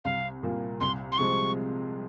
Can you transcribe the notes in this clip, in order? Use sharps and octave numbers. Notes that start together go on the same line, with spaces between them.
C2 F5
A#2 G3 A#3
C2 C6
C6
C3 F3 G#3 C4 C#6